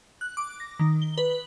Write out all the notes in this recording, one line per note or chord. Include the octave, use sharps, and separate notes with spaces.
F#6
D6
A#6
D#3
G7
B4